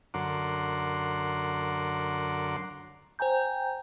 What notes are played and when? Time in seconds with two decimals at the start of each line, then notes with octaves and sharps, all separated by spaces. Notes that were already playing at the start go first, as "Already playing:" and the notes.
0.14 F#2 D3 A#4 F#5 C6 D6
3.19 C5 G5 G#5 A#5 G6